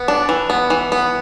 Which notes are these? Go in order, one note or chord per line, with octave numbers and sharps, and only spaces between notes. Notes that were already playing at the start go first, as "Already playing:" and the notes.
Already playing: B3
D4
E3
B3
E3
B3